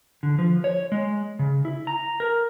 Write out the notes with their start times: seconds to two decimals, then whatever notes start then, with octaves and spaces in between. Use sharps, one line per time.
0.23 D3
0.39 F3
0.64 C#5
0.92 G#3
1.39 C#3
1.65 E4
1.87 A#5
2.20 A#4